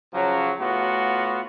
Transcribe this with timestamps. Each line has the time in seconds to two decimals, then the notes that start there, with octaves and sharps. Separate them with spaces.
0.14 C#3 F3 F#3
0.59 A2 B3 F4 F#4